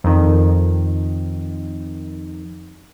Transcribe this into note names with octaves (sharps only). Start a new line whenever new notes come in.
F2 D#3